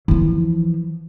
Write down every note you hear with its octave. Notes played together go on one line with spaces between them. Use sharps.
E3 F3